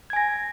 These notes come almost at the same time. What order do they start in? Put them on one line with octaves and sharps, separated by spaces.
G#6 G#5 A#6